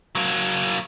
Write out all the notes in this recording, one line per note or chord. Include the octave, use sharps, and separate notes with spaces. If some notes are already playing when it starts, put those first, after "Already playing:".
F#3 A#3